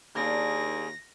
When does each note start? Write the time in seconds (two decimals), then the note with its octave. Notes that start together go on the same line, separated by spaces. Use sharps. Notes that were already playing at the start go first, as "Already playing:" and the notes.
0.16 D#2 A#3 D4 G#4 A#6